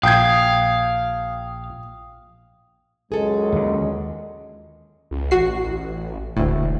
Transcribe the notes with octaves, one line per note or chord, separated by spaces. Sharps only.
A#1 F5 G5 D#6 G6 G#6
C#2 F#2 C#3 G#3 G#4 A4
D#2 D3
C#2
A1 F#4 C7
E1 D2 A2